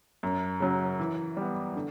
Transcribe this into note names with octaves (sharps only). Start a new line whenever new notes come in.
F#2
C#3 F#3
E3
G3 B3
D3